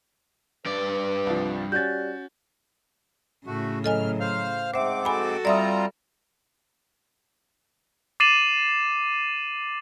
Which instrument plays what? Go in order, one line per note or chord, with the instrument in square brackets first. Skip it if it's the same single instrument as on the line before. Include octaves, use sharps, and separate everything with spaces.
[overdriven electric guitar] G2 D5 [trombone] B4
[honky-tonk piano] C2 F3
[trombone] G3 [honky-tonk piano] C#4 F#4 [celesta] G6 A6
[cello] A2 C#3 [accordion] A3 F#4
[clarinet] F#3 [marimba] A4 D#5 G#5 [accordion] F6
[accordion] C5 F5 F6
[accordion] G#2 C4 D6 [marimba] C5 E5 [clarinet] F#5
[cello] F#4 A4 [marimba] G#5 B5
[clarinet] G3 [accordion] C4 F4 A#5 [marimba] D5 E5 D#6
[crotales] D6 A6 C7 D#7 E7 F#7